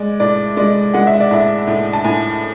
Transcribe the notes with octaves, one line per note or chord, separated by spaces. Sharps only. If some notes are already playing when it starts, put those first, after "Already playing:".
Already playing: G#3 D5
A2 D5
G#3 D5
G#3 F#5
E5
D5
A2 E5
A2
A5
A2 G#5